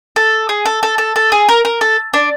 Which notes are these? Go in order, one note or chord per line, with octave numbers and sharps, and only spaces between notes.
A4
G#4
A4
A4
A4
A4
G#4
A#4
A#4
A4
D4